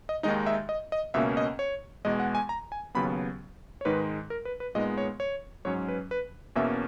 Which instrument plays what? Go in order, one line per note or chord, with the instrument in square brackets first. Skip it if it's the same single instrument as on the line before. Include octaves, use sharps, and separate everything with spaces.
[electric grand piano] D#5
D#2 D#3 G#3 D#4 D#5
E5
D#5
D#5
C#2 B2 A#3 C#4 E5
D#5
C#5
E2 B2 G#3 D#5
F#5
G#5
A#5
G#5
D#2 C#3 F#3 B3 B5
C#5
G#2 D#3 G#3 D#4 B4
A#4
B4
B4
A#2 G#3 B3 D#4 D#5
C#5
C#5
G#2 F#3 C#4 C#5
B4
B4
E2 B2 A#3 C#4 E5